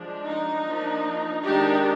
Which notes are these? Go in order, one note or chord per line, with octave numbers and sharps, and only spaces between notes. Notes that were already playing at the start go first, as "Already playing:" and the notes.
Already playing: F3 G#3 D4
D#4
F3 A#3 D4
D#3 G#3 D4 D#4 G4